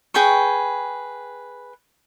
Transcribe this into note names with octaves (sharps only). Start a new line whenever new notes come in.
G#4 B4 G5 C#6